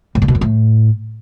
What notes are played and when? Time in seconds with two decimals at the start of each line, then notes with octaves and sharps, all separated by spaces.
0.15 A2
0.22 A#2
0.28 B2
0.35 F#2
0.41 A2